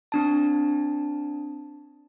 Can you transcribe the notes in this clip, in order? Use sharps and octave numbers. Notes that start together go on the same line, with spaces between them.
C4 D4 A5